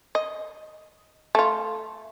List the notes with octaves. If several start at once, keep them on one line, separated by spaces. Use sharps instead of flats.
D#5
A3 F4